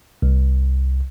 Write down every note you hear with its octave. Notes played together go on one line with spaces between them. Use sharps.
C2